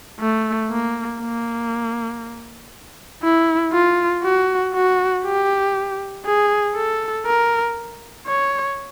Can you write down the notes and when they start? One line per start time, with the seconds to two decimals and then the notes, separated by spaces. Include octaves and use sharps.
0.20 A3
0.70 A#3
1.21 A#3
3.23 E4
3.73 F4
4.24 F#4
4.74 F#4
5.24 G4
6.25 G#4
6.76 A4
7.26 A#4
8.27 C#5